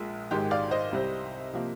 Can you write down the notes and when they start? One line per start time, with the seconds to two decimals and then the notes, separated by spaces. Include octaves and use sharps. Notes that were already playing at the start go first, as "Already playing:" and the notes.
Already playing: A#1 A#2 G#3
0.31 G#1 G#2 D#3 G#3 G4
0.51 D5 F5
0.71 C5 D#5
0.92 C2 C3 G3 C4
1.53 C3 F3 A#3